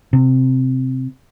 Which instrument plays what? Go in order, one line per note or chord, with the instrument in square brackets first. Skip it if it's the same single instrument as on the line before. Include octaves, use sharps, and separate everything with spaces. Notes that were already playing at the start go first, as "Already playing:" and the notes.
[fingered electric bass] C3